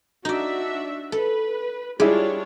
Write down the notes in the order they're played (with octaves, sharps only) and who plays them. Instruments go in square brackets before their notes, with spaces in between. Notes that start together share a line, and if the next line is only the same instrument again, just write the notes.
[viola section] D4 F#4 E5 [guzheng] D#4 D5
[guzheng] A4 [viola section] B4
[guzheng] G3 [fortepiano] G#3 E4 [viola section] D4 F4 C#5